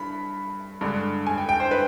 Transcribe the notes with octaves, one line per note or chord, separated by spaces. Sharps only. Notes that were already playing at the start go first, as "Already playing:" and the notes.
Already playing: G2 B5
G2 D3 G#3
G#5
G5
G5
C5
B4